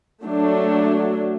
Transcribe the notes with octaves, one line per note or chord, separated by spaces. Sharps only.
F#3 A3 D4